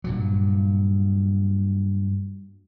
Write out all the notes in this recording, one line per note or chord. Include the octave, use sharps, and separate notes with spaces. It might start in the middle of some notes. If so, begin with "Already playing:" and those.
G2 A#2 F#3